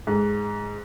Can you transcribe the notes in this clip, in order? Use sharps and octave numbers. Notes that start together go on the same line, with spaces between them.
G#2